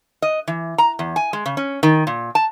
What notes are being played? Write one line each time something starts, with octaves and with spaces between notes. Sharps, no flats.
D#5
E3
A#5
E2
G#5
G#3
C#3
C#4
D#3
A#2
A5